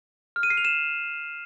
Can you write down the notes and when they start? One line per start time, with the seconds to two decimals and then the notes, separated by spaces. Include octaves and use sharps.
0.36 F6
0.43 D#7
0.50 C7
0.57 F7
0.65 E7